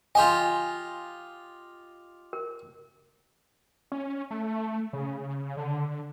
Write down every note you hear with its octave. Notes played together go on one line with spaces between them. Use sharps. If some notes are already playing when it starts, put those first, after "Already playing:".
F4 G4 D#5 G#5 C6
A#4
C#4
A3
C#3
D3